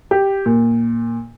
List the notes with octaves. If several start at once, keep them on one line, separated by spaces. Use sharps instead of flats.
G4
A#2